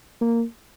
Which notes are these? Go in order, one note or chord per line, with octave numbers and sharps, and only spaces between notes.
A#3